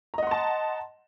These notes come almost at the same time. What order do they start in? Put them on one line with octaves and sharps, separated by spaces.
A#5 D#5 F#5 C6 A5